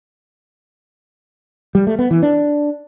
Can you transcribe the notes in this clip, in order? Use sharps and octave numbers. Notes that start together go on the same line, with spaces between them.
G3
A3
B3
E3
D4